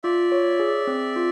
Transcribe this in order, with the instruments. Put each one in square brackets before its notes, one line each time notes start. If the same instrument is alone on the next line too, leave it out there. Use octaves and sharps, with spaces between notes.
[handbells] F4 [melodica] D5 E5
[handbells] C#5
G#4
C4
F4